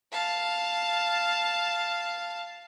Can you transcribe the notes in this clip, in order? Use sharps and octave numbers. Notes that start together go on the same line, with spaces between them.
F5 A5